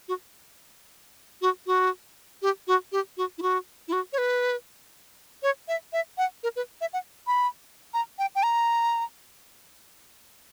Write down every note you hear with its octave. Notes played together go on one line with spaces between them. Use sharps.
F#4
F#4
F#4
G4
F#4
G4
F#4
E4
F#4
E4
F#4
C#5
B4
C#5
E5
E5
F#5
A#4
B4
E5
F#5
B5
A#5
G5
G5
A#5